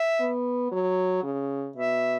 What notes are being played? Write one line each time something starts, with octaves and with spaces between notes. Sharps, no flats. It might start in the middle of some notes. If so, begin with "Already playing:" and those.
Already playing: E5
B3
F#3
C#3
B2 E5